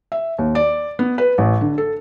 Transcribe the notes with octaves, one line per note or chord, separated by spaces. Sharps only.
E5
D#2
D5
B3
B4
A1
D3
A4